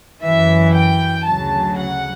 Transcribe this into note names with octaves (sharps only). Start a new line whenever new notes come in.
F#2 E3 E5
G5
D2 C#3 F#3 A5
F#5